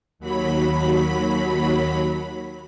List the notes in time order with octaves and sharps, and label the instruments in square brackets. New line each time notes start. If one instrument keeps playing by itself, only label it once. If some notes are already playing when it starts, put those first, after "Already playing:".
[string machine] D#2 F#3 B5 B6